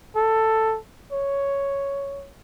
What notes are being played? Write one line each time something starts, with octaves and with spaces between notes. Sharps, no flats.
A4
C#5